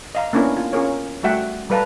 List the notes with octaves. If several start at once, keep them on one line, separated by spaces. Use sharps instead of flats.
D#5 F5 A#5
A#3 B3 C#4 D4 E4 A#4
F4
C#4 F4 G#4 A#4 C#5
G3 A3 F#4 E5 F#5 G5
G3 A4 B4 F5 A5 A#5